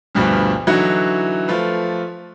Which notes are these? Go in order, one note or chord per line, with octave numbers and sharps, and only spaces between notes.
D2 G2 B2 F3 G3
D3 E3 F#3 D#4 E4 F#4
F3 A3 F4 B4